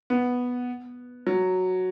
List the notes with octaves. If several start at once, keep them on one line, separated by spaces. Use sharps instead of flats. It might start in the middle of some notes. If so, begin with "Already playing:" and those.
B3
F#3